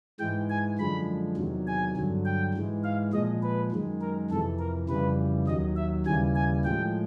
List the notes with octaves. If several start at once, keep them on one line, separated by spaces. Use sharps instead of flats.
G#2 E3 G#3 G5
G#5
F#2 D3 F3 G#3 B5
E2 C3 D#3 F#3
G#5
G2 D3 F#3
G5
G#2 E3 G#3
F5
A#2 F3 G#3 D#5
B4
F#2 D#3 G#3
A#4
F2 C3 E3 A4
A#4
F2 C#3 E3 G3 B4
D#2 D#3 F#3 D#5
E5
D#2 C#3 E3 G3 G#5
G#5
A2 F3 G#3 G5